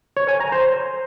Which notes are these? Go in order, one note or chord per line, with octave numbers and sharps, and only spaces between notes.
C#5
G#5
A#5
C5